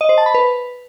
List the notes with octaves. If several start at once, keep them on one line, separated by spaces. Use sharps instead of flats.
D#5
C5
A5
B5
B4